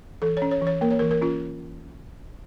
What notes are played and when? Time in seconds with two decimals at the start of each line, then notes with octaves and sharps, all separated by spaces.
0.22 E3 A4
0.37 C#4 C#5
0.51 C#5
0.62 E3 C#5
0.81 A#3 A#4
0.91 C#5
0.99 E3 A#4
1.11 A#4
1.21 C#4 F4